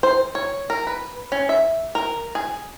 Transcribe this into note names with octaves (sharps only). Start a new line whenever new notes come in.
C5
C#5
A#4
B4
C#4
E5
A#4
G#4